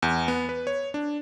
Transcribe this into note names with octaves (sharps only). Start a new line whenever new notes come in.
E2
B3
B4
C#5
D4